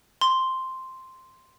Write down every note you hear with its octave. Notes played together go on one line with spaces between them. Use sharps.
C6